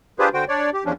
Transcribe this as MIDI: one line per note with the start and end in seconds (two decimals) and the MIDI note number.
0.19 0.29 62
0.19 0.29 65
0.19 0.29 67
0.19 0.29 68
0.19 0.29 71
0.19 0.29 72
0.34 0.45 50
0.34 0.45 66
0.34 0.45 72
0.34 0.45 79
0.48 0.70 62
0.48 0.70 73
0.48 0.70 74
0.73 0.84 67
0.85 0.93 40
0.85 0.93 53
0.85 0.93 61
0.85 0.93 62